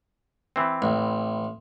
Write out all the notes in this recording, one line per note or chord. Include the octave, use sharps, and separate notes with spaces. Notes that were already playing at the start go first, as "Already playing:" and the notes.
E3 C4
A1